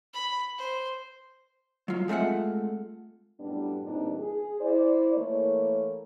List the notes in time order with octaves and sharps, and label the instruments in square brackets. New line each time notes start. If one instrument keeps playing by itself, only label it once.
[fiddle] B5
C5
[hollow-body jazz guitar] F#3 F4
G#3 A3 C4 F4 F#5
[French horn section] F#2 A2 G3 B3 D4
E2 G2 A#2 C4 D4 D#4
G#4
E4 C5 D5
E3 A3 A#3 A#4 C#5